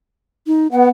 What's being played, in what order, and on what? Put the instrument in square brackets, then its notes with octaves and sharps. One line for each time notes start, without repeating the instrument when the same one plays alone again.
[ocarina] D#4
[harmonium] B3 [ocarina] F#5